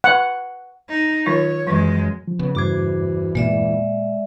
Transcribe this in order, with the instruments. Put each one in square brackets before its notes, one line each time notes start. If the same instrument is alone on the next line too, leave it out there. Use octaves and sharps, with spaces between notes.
[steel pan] F#5
[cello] D#4
[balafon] D#3 F#3 F4 [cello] C#5
[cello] F#2 G#3 [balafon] E3 F#3
[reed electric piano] F3
[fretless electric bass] C#3 [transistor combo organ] B3
[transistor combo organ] E2 [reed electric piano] G2 D6 G#6 [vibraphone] F#4 C5
[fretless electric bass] A#2 A#3 B3 [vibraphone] G#3 D5 E5